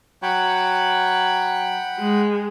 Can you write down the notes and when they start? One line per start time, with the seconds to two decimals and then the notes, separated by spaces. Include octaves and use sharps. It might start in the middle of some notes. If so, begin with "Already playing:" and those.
0.23 F#3 F#5 G5 B5
1.99 G#3